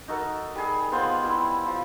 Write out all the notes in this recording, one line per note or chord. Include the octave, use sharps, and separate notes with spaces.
D#4 F#4 A4 A#4
G3 G#4
B3 C4 F4 C5
G3 E4
F3